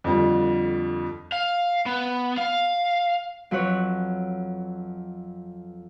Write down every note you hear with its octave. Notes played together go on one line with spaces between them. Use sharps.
F2 D3 F3 G3
F5
B3
F5
F2 F#3 F#4 B4 C#5 F#6